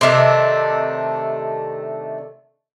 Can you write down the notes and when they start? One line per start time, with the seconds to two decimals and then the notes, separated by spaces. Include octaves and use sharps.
0.01 C3 D#3 A3 D4